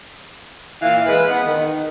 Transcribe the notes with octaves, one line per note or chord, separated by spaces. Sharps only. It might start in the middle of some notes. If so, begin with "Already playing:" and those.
A#2 E3 F5
E3 G#3 B4
B3
D#3